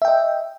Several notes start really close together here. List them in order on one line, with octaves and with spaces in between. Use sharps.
E5 G5 D#5